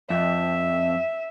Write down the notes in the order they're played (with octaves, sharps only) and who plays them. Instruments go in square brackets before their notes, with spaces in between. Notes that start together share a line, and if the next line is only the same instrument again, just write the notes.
[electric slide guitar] F2 [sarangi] E5